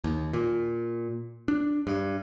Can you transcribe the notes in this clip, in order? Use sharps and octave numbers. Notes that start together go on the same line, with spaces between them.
D#2
A#2
D4
G2